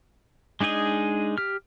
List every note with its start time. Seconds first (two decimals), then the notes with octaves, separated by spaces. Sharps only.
0.61 G#3 D4 D#4 G#4 D#5
1.38 G4 F6